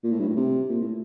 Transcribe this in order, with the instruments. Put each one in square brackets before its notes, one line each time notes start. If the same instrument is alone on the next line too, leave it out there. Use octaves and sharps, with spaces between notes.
[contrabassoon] A#2
A2
G2
A2
C3
A#2
A2